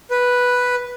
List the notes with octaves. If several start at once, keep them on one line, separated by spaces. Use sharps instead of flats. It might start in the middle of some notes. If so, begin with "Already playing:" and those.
B4